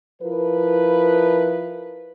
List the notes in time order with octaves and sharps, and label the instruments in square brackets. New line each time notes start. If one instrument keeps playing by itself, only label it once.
[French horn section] F3 E4 A#4 B4